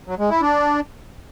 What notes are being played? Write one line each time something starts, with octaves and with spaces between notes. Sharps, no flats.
F#3
G#3
E4
D4